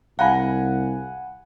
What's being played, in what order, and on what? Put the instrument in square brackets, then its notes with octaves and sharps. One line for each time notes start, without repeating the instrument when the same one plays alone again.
[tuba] C2 [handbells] F5 [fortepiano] F#5 G#5 B5